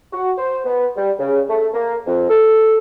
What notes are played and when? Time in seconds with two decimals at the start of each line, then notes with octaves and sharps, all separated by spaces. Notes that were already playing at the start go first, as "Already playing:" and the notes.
0.13 F#4
0.37 C5
0.65 B3
0.97 G3
1.19 C#3
1.49 A3
1.74 A#3
2.06 F2
2.29 A4